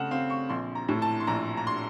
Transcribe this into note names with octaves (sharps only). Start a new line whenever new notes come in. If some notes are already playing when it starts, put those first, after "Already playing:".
Already playing: C#3 A3 C4 F#5
C4 F5
C#6
A#1 C6
A#5
A2
A5
C6
A#1 A#5
A#5
C6